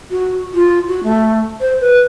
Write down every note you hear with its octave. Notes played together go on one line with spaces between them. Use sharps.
F#4
F4
F#4
A3
C5
B4